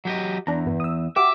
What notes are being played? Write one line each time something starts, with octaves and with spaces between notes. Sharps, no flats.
F#3 G4 D#5
E2 D4 A#5
G2 B3
D#6 E6
F#4 G4 E5 D6